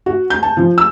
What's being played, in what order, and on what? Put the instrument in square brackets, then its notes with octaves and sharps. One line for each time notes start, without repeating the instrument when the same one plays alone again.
[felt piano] F#4
G6
A5
F3
E6